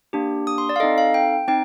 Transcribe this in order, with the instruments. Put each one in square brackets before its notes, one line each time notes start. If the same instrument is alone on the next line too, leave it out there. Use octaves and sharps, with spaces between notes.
[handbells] A#3 D4 G4
D#6
C6
D5
F5
C4 D#4 A4 D#5
F5
G5
C4 D#4 G5